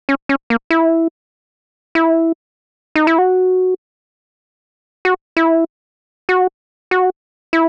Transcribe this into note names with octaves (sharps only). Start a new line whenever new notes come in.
C#4
C#4
A#3
E4
E4
D#4
E4
F#4
F#4
E4
F#4
F#4
E4